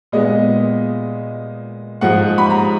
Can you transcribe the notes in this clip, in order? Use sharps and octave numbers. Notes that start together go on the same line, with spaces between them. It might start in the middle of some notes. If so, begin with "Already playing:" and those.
A#2 G#3 B3 D#5
G#2 F3 G#3 F#5
B5
A#5